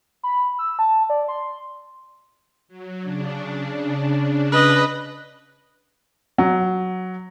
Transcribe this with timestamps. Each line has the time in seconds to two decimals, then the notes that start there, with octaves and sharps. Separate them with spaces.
0.23 B5
0.59 E6
0.79 A5
1.10 D5
1.28 C6
2.68 F#3
3.01 C#3 D4
4.52 B4 D#5
6.38 F#3